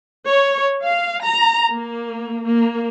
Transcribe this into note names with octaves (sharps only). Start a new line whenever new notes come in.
C#5
F5
A#5
A#3
A#3